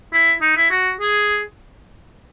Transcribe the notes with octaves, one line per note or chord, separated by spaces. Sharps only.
E4
D#4
E4
F#4
G#4